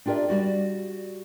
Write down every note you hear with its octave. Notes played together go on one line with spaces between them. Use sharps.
D4 F4 G4 A#4 D5 E5
G3 F#4 D5